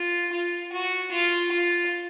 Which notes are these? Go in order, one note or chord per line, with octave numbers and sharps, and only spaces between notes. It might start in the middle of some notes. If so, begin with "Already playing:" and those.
Already playing: F4
F4
F#4
F4
F4